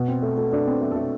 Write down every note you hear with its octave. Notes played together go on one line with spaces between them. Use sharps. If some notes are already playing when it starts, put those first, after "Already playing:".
Already playing: B2
C4
A3
A3
A3 D4
C4
A3
A3 A4